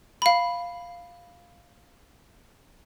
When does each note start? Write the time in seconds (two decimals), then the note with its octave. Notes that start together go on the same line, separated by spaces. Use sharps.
0.22 F5 B5